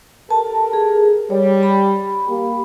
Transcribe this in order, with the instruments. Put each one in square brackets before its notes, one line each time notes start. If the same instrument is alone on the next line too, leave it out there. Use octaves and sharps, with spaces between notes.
[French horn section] G4 A4 A#4 [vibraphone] A5
[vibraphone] G#4
[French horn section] G3 [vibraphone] C#5
[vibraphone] B5
[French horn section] A#3 G4